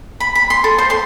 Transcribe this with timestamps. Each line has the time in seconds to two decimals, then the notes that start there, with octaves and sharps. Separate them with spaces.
0.20 B5
0.35 B5
0.50 C6
0.64 A4
0.78 C5
0.90 C6